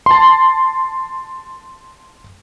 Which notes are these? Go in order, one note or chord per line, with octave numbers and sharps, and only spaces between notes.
A5 C6